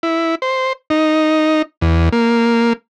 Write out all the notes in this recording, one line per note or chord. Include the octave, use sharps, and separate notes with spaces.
E4
C5
D#4
E2
A#3